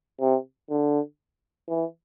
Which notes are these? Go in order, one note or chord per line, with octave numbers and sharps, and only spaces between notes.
C3
D3
E3